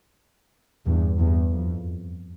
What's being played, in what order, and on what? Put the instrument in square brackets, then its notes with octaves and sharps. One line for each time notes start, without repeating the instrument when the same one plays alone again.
[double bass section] E2 G2
E2 G2
F2